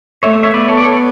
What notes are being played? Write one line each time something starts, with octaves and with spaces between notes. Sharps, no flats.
A3 C#5 E5
C#5 E5
B3 B4 D5
A4 C#5
D5
A4 C#5